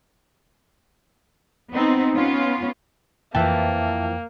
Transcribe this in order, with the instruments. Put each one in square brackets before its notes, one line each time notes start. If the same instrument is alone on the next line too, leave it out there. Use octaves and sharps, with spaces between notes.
[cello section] B3 C4 D#4
B3 C#4 F4
[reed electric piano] F2 G5 [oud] E3 F3 [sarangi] A#3 [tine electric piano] E5 A5